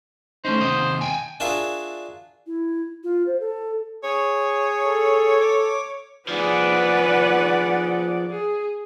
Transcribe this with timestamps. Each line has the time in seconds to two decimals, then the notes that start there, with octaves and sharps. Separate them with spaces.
0.45 A3 C#4 D#4 C5
0.61 D#2 C3 D#5
1.01 G5 G#5
1.40 D4 F4 F#4 G#4 A#4 E5
2.47 E4
3.04 F4
3.26 C5
3.40 A4
4.04 G#4 C#5
4.86 A4
5.40 D6
6.29 F3 G#4 B4 D5 F#5
8.30 G#4